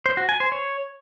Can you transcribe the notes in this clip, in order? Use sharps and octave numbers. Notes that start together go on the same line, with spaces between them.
C5
F#4
G#5
C5
C#5